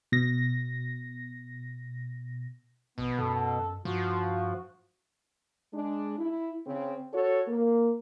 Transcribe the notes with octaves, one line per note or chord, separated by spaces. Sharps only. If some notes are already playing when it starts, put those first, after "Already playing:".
B2 A#6
A#1 B2 B3
F#2 A4
G2 F3 F#4
G#3 D4
E4
C#3 C4
F#4 A4 C#5
A#3